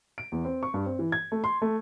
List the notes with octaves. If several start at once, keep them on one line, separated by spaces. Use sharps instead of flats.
D7
E2
C4
C#6
G2
C4
E3
G#6
A3
C6
A3